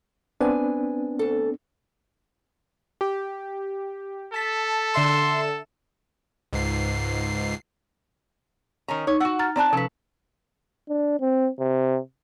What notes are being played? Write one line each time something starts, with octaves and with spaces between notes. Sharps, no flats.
B3 C4 D4 B4 G#5
D2 A4
G4
A4 A5 B6
D3 E5 C6 E7
C#2 G#2 C7
D#3 C#4 A#5
D#4 C#5
F#4 F#5 E6
A#5 F6 A6
C4 D5 A5 A#5 F#6
C3 F3 C#4 A4 B4
D4
C4
C3